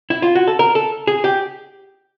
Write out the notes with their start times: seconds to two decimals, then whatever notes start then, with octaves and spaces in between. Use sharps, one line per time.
0.10 E4
0.22 F4
0.35 F#4
0.48 A4
0.59 A#4
0.75 A4
1.07 G#4
1.24 G4